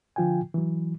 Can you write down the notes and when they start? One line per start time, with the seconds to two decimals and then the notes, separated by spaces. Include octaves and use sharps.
0.16 D3 F3 F4 G5 G#5
0.54 E3 F#3